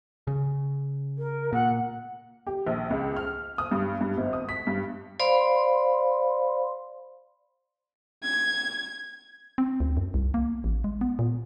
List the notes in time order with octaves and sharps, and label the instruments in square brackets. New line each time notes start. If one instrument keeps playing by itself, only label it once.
[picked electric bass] C#3
[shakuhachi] A#4
[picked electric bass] A#2 [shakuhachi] F#5
[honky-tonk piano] G4
A#1
C#2
F6
D#6
G2
G2
G#1
D#6
B6
G2
[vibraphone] C5 D5 F5 B5 C6
[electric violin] G#6
[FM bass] C4
D2
F#2
C2
A#3
A1
G#3
B3
A#2